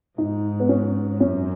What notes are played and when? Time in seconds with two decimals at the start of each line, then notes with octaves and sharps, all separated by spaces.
0.18 G#2 D#4
0.60 B3
0.69 C#4
1.20 F#2 C#4